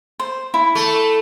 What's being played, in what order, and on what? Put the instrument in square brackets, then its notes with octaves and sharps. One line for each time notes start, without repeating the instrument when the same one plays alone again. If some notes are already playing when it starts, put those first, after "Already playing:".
[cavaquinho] C5
E4
[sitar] A3